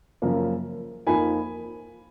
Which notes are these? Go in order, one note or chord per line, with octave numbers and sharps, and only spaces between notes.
F#2 C#3 F3 A#3
F2 F3 A#3 D#4 G#5 B5